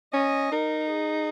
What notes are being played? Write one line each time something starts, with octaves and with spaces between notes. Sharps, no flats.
C#4 D#5
D#4 A#4
G#4